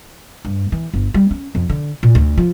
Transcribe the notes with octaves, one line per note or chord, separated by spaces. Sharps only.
G2
E3
G1
G3
C#4
F2
D3
A#2
D2
F3